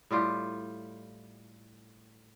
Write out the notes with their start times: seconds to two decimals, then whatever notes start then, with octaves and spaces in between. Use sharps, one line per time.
0.11 A2 G3 F4 G4